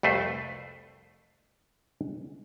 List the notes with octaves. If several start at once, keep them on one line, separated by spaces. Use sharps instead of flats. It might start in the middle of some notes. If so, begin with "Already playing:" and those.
C2 F2 A3 B4 C5